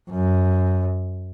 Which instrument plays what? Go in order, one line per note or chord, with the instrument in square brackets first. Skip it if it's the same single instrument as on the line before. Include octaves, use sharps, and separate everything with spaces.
[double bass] F#2